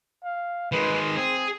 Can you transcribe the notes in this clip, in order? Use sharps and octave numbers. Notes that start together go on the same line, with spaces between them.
F5
D#3 G#3 B4
C4 G#4